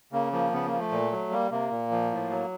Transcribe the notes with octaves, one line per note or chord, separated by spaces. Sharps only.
C#3 A#3
F3 A#3
C#3 B3
A#3
F3
A3
A#2
F#3
G3 A#3
C3 A#3
A#2
F3
A2
F#3